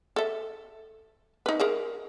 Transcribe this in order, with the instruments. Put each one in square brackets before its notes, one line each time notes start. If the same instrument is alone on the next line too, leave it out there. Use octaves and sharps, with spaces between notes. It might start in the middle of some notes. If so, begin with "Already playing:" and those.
[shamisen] A4 E5
D#4 B4
G#4 A#4 E5